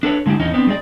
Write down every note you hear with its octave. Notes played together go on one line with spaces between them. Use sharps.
D4 A4 B4 C#5
D3 G#3 A3 E4 G4
E2 E3 C#4 D#4
B3 C4 D4
G3 G#3 D5